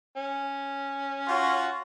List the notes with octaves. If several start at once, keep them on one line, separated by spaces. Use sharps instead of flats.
C#4
F4 F#4